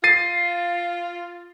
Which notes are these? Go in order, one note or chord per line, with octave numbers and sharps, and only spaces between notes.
F4 A6 C7 D#7